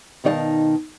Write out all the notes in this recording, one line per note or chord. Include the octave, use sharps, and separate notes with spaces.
B2 D#3 D#4 D5 F5 A5